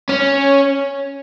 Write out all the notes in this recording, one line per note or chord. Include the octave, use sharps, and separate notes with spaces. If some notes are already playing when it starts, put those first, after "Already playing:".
C#4